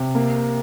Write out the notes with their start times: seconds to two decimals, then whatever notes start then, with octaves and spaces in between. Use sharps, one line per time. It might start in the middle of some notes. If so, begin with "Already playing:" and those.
Already playing: C3
0.15 A#3